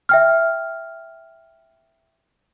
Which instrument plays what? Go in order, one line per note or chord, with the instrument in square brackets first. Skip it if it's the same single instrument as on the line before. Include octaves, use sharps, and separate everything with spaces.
[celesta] E5 G5 F6